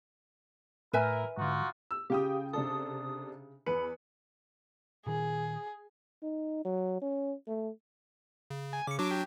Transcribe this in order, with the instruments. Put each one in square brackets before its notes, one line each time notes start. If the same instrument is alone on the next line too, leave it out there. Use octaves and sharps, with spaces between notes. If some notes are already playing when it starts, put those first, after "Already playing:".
[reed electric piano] A2 [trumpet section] E4 A#4 [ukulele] B4 E5 G#5
[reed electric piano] G#2 D3 [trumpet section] D#4 F4 F#4
[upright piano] E6
[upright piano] C#3 [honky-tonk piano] F4 G5 D#6 [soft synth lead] G4
[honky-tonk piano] C3 D4 A4 [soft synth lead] D#6
[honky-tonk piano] E2 C#7 [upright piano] B4 [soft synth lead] B5
[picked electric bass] A#2 D#3 [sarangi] G#4
[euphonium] D#4
F#3
C#4
A3
[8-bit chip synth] C#3
[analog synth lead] G#5
[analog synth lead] C#3 [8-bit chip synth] D6 C#7
[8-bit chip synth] F#3 D4 F#4 [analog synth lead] D6
[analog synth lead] G4